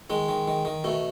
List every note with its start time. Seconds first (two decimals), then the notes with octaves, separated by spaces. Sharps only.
0.10 D#3 G#3
0.29 D#3
0.48 D#3
0.65 D#3
0.84 B2 A3